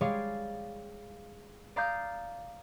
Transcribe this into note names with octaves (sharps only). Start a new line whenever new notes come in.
G3 G#3 G#4 C#5 D5 F5
D5 F5 A#5 D6 D#6 G6